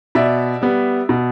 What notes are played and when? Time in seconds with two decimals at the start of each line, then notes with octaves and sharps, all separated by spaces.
0.15 B2 D5 E5
0.62 G3 B3
1.09 B2